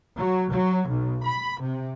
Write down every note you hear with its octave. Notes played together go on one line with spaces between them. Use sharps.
F#3
F#3
B1
B5
C3